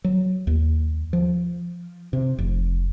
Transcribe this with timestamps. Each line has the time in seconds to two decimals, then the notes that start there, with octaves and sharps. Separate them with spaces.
0.04 F#3
0.47 D#2
1.13 F3
2.13 C3
2.38 F1